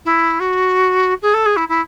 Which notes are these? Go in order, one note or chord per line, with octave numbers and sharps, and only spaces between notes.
E4
F#4
G#4
A4
G#4
E4
E4